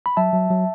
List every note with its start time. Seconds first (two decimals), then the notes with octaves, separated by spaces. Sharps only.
0.06 B5
0.17 F#3 E5 A5
0.33 F#3
0.50 F#3